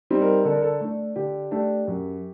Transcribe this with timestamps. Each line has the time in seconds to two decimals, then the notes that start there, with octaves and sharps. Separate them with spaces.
0.10 G3 C4 D#4
0.22 A#4
0.45 D3 A4
0.53 A#4
0.62 A4
0.81 A3 D4
1.16 D3 G4
1.51 A3 D4 G4
1.88 F#2